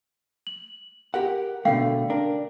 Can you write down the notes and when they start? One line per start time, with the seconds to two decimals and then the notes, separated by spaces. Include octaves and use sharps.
0.47 F#7
1.14 G4 A#4 F#5
1.65 B2 D3 A3 F5 G5
2.10 D4 A#4